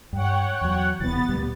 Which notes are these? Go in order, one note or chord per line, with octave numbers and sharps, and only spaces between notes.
G2 C#5 F#5 G5
E2 F#3
D#1 C2 E3 B3 A6
D2 A#2 G3